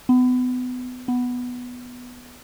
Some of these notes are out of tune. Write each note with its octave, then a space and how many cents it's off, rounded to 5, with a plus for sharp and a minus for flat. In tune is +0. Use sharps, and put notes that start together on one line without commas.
B3 +30
B3 +0